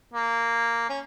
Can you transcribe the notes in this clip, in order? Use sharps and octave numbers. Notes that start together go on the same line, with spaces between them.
A#3
C#4